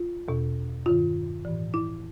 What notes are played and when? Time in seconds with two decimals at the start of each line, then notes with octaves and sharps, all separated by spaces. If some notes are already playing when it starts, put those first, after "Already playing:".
Already playing: F4
0.28 E2 B2
0.86 G2 D#3 F4
1.45 A2 E3
1.74 E4